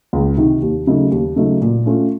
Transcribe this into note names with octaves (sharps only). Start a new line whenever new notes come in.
C#2
C3 D#3
D#2
C#3 F#3 A3 D#4
D#2
C#3 F#3 A3 D#4
A#2
A3 C#4 F4